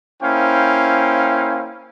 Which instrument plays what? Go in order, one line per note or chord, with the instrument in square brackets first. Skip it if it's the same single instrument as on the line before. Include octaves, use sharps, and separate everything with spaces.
[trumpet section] A#3 C#4 E4 C5 F5 G5